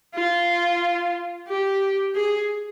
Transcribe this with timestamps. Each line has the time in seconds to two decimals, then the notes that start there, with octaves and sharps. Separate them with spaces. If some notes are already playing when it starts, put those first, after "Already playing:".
0.15 F4
1.48 G4
2.15 G#4